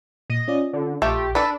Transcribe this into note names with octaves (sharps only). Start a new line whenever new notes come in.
A#2 D#5
C#4 F4 D5
D3
A#1 A3 F4 G4
D4 A4 B4 D5